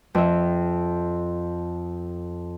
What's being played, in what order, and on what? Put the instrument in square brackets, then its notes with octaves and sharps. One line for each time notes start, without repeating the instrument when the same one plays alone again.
[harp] F2 E5